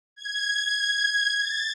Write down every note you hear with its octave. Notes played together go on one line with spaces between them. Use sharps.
G#6
A6